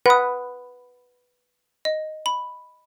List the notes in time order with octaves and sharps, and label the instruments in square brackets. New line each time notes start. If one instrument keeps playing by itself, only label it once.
[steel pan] B4 [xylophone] F#5 D#6
[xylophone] D#5
B5